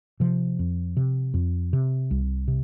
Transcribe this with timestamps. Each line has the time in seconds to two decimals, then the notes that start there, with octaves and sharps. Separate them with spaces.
0.20 C3 F3
0.59 F2
0.97 C3
1.34 F2
1.73 C3
2.11 C2
2.48 C3